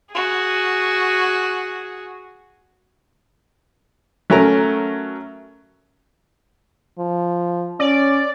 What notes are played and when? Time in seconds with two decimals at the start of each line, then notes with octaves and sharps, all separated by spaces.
0.12 F#4 G#4
4.30 F#3 A3 C#4 A#4 A#5
6.99 F3
7.80 C#4 D5